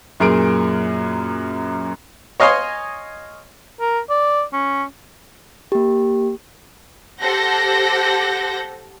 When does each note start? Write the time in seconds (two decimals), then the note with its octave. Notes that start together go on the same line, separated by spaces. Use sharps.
0.20 F#2 A#2 G#4 A#4 A#5 D7
2.40 C#5 D#5 F5 G#5 C6
3.81 A#4
4.10 D5
4.53 C#4
5.72 A#3 G4
7.21 G4 A4 C5 F#5 G6 A#6